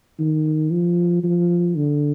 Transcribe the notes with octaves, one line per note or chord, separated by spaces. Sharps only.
D#3
F3
F3
D3